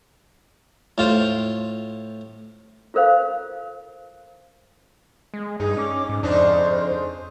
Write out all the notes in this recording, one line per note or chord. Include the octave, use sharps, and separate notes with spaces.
A2 F4 C5
F4 A4 A#4 C5 F5
G#3
G2 D#4 G#4
C#4 D6
G#2
F2 C#3 D4 D#4 C5